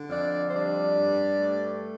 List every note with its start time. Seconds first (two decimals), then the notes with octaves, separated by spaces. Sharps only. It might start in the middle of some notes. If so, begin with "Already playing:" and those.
Already playing: D3
0.10 F2 D4 D5
0.47 C5
0.53 G3 D4 D5
0.97 G2
1.39 A3